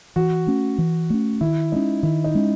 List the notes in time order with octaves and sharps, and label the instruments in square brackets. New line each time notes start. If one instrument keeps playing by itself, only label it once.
[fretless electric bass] E3 [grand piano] F#4
[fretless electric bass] A3 C#4
E3
A3 C#4
[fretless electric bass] D#3 [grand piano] E4
[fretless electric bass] G#3 C#4 [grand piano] D#4
[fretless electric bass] D#3 [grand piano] E4
[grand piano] D#4
[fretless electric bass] G#3 C#4